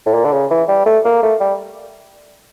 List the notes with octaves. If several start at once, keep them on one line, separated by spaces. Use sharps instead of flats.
A2
A#2
D3
C#3
E3
G3
A3
A#3
A3
G3